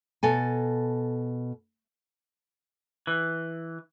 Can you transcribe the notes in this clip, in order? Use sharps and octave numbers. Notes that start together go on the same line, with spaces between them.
B2 A4 G#5
E3